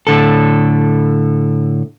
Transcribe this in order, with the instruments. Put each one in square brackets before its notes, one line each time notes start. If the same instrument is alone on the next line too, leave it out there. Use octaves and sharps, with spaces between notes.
[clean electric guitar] A2 D3 A4